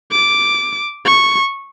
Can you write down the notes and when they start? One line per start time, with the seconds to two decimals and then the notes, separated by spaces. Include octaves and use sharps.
0.12 D6
1.06 C#6